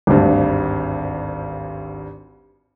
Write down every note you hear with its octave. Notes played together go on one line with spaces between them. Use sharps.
G#1 D2 G2